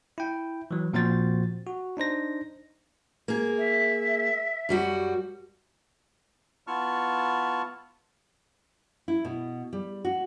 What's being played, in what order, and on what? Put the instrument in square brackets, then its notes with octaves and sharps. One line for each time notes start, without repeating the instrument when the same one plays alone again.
[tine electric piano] E4 G5
E3 F#3
A#2 F3 C4 F#4 C5 A6
F#4
D4 D#4 C5 A#6
[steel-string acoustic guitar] A#3 G#4
[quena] E5
[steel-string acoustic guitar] F#2 G3 F#4
[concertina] B3 E4 F4 A5 C#6 F6
[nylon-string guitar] E4
B2
G3
F#4